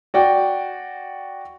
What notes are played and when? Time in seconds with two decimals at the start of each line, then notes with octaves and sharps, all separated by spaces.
0.14 F#4 D5 G5